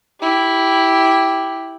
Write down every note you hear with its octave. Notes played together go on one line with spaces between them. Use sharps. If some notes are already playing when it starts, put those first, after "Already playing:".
E4 G4